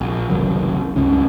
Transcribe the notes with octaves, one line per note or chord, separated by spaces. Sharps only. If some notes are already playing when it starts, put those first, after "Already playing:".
A#1
F#1 C2 D#3 F#3
C#2 G2 C#3 C#4